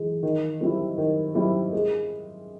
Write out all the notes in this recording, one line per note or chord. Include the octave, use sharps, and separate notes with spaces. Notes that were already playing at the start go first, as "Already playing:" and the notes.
Already playing: E3 G#3
D#3
G3 C4 E4
D#3
G3 C4 E4
G#3